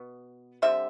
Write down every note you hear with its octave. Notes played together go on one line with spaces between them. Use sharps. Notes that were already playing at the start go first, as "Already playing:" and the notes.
Already playing: B2 B3
D3 G3 C4 E5